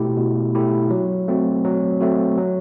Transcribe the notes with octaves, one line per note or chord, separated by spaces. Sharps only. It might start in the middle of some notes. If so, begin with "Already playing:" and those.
Already playing: B2 A3 E4 G4
B2
A3 E4 G4
F#3
A3 C4 F#4
F#3
A3 C4 F#4
F#3